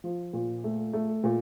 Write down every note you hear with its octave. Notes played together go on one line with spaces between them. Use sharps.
F3
A#2
A3
A3
A#2